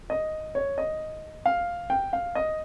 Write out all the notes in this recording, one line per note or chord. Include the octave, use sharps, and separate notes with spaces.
D#5
C#5
D#5
F5
G5
F5
D#5